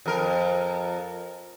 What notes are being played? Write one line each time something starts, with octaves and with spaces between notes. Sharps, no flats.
F2 A#4